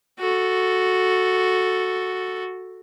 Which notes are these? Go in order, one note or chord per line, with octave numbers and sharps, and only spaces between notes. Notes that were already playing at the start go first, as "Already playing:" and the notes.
F#4 A4